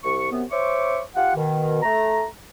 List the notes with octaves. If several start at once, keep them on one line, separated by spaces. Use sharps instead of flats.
C2 C#6
F#2 C3 B3
C5 C#5 E5 C#6 D6
F4 G4 F#5
B2 D#3
A3 A#5